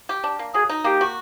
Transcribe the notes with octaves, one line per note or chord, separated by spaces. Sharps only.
G4
D4
A#3
F#3 G#4
D#4
A#3 G4
F#4